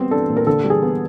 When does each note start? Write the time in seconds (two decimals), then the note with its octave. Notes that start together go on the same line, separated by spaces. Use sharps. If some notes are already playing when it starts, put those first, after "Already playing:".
Already playing: G3 B3 C4 C5
0.11 D4 A4
0.29 A#2
0.37 A#4
0.47 D3 A4
0.65 G3
0.70 G#4
0.82 B3